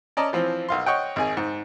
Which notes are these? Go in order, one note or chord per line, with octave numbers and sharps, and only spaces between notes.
C#4 D5 D#5 A5 A#5
E3 F3 C4
B1 F5 C6
C#5 D#5 F#5 G5
G#1 G#4 G#5
G#2